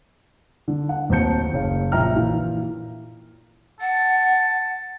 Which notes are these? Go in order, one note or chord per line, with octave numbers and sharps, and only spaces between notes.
D3
F#5
D1 D#2 C4 A5 G6 C#7
F#1 C#5 F5
A#1 F3 E5 G5 A#5 F6
A#2 E3 F4
F#5 A5